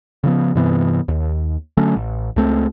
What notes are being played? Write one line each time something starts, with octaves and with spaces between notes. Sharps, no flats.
C#3 F3 B3
G2 C3 E3 B3
D#2
D3 F#3 A3 C#4
A1
C#2 A3 C4